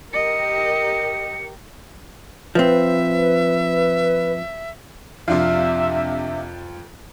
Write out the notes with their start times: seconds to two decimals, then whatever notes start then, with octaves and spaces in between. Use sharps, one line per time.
0.13 G4 A#4 D#5 C#7
2.55 F3 C4 B4 E5
5.28 F2 C3 D4 F4 E5 F5